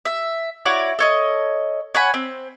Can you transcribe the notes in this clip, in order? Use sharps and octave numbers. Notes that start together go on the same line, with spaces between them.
E5
E4 F#4 C#5 D5
A4 C#5 D#5
C#5 F#5 G#5 B5
C4